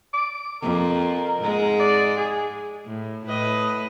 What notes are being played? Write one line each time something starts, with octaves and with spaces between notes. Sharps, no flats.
D6
F2 A#4
G#2 G#3
D5
G#4
A2
A2 B4 D#5